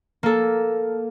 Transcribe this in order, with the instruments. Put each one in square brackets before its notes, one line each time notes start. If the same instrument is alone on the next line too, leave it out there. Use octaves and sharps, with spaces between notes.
[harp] A#3 A4